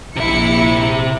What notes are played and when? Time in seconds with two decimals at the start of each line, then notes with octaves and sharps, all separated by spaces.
0.16 A#1 C3 E4 E5 C#7